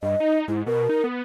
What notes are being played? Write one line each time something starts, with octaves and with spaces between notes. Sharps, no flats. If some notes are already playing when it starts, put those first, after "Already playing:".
G2 D#5
D#4
G#2 E4
B2 A#4
D#4
B3